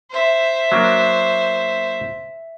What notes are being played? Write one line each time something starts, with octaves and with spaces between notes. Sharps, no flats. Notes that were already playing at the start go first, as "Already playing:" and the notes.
C5 E5
F#3 A#3 D4